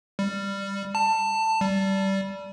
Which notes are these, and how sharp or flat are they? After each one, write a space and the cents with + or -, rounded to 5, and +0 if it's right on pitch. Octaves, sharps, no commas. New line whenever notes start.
G3 +10
A5 +15
G3 -15